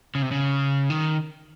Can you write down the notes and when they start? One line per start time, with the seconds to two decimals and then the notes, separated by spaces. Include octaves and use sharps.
0.15 C#3
0.22 C3
0.31 C#3
0.90 D#3